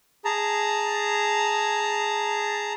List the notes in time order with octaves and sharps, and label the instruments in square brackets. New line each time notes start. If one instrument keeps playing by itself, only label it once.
[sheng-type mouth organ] G#4 A5 A#5